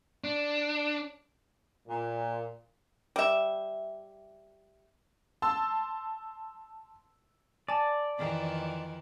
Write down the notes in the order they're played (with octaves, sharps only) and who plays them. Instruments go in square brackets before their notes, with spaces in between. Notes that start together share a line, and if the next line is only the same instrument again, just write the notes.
[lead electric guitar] D4
[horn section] A#2
[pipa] G3 E5
[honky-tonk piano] A5 C6 E6
[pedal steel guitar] D5 [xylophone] G#5 A5
[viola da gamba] F2 D#3 E3